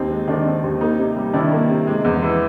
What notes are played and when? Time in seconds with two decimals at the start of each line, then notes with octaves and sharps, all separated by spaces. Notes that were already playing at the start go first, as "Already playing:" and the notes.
Already playing: D#2 C4 D#4
0.10 G#3
0.28 D#3 D4
0.46 C4
0.64 D#2
0.81 A#3 D#4
0.99 C3
1.16 G3
1.33 D#3 D4 E4
1.51 A#3
1.70 C3
1.87 G#3
2.05 E2
2.22 E3